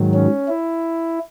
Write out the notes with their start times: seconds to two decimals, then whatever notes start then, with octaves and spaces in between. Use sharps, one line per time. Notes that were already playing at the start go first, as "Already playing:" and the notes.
Already playing: G#2 D#3 F#3
0.14 C#4
0.48 E4